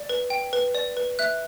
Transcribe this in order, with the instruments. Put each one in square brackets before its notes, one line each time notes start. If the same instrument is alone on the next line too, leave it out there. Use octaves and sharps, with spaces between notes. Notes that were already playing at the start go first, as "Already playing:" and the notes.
Already playing: [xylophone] D5
B4
G5
B4
D5
B4
E5 F#6